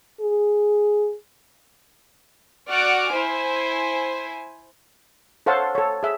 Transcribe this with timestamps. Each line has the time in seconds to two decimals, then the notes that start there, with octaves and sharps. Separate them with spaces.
0.21 G#4
2.70 F#4 D5 F#5 D6 F6
3.12 E4 C5 G#5
5.46 A4 C5 C#5 F5 F#5 A5
5.75 A4 C#5
6.03 G#4 E5